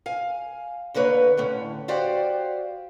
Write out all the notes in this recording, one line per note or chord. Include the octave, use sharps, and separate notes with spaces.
F5 G#5
E2 D3 A#3 B4 C#5
A2 D3 C#4
F#4 G4 C5 D5 F5